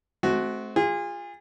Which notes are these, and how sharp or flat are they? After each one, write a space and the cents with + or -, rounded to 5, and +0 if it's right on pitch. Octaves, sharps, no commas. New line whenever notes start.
A3 -40 C4 +0 F#4 +0
F4 +0 G#4 -30